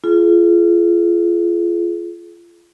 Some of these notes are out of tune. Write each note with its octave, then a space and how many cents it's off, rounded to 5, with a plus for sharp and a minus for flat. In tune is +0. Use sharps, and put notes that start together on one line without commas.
F4 -25 G#4 +35